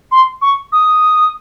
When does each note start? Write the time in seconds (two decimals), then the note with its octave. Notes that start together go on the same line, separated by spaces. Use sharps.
0.12 C6
0.42 C#6
0.72 D#6